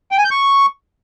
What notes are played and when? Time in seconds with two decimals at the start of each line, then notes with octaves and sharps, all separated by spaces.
0.11 G5
0.18 G#5
0.24 G6
0.31 C#6